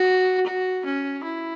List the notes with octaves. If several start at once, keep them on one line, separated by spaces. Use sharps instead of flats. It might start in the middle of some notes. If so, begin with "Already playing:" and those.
Already playing: F#4
F#4
C#4
E4